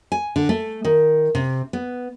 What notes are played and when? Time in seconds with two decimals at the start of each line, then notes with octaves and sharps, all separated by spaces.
0.12 G#5
0.36 D3
0.49 A3
0.85 D#3
1.35 C3
1.73 B3